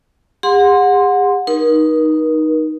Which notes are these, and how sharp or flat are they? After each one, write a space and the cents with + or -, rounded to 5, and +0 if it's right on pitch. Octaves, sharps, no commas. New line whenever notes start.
G#4 -45 F#5 -25 C6 +0
D#4 -5 A#4 +45